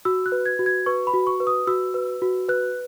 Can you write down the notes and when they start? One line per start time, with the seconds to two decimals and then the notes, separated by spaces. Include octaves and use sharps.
0.05 F#4 E6
0.26 F#6
0.32 B4
0.46 G#6
0.59 F#4
0.66 G#6
0.86 B4 C#6
1.07 B5
1.14 F#4
1.27 C#6
1.40 B4
1.47 D#6
1.67 F#4 E6
1.94 B4
2.22 F#4
2.49 B4 F#6